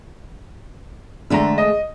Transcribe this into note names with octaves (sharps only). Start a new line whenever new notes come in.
D3 G#3 A3 E5 A#5
D#5